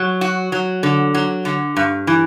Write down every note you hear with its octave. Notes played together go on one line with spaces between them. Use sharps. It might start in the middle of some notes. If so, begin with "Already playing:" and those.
Already playing: F#3
F#4
F#3
D3
F#3
D3
G2
E3